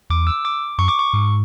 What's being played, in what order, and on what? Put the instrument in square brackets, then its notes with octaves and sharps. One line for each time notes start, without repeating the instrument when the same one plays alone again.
[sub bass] E2 [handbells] D6
[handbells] E6
D6
[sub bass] F#2 [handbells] C#6
[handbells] D6
C#6
[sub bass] G#2